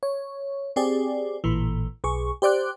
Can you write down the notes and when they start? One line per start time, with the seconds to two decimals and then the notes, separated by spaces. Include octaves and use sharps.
0.03 C#5
0.76 C4 G4 G#4 D5
1.44 A1 A#2 E3
2.04 B1 G#4 C#6
2.42 G4 C5 D5 D6 F#6